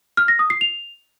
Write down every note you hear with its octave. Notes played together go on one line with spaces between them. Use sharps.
F6
A#6
D#6
C7
F7